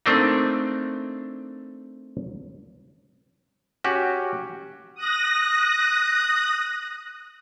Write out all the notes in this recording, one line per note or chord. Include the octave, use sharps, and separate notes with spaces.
A3 A#3 C4 D4 D#4
C#4 F#4 G4
D#6 F#6 A#6